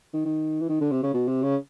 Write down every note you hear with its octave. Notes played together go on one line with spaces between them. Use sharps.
D#3
D#3
E3
D#3
D3
C3
C#3
B2
C3
C#3